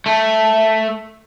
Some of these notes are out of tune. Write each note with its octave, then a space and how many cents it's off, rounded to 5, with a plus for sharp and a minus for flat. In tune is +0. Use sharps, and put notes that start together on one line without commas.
A3 +0